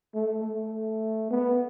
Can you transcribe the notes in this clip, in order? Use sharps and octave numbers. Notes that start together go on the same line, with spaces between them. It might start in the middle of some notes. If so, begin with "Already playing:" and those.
A3
A3
B3